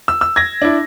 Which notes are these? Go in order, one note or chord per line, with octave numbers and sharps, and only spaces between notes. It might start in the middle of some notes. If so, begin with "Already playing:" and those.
E6
E6
G#6 A#6
D4 E4